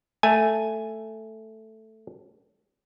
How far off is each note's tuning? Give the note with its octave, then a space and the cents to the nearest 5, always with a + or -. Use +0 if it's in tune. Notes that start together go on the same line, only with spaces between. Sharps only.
A3 +0 G#5 +0